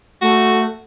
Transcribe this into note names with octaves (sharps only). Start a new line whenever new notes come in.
A3 F#4